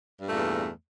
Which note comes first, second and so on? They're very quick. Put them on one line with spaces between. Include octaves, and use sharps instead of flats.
G2 A3 A#2 E2